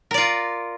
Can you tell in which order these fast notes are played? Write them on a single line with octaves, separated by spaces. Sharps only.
A#4 D5 F4